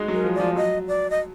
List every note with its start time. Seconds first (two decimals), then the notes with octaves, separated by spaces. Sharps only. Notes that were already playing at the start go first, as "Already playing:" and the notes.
Already playing: G#3 D#4 F#4 G#4
0.08 F#3
0.13 A#4
0.24 F3
0.35 F3 D5
0.56 F#3 D#5
0.88 D5
1.10 D#5